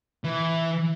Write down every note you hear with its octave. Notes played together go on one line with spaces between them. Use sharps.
E3